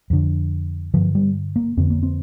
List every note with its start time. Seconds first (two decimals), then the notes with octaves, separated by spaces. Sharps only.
0.10 F2 D3
0.94 G2 D3 F3
1.15 G3
1.56 A#3
1.77 F2 D3 C4
1.90 A#3
2.03 C4